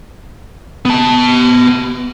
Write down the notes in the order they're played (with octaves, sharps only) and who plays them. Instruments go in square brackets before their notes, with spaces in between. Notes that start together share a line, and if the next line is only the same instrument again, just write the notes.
[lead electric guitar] B3 A5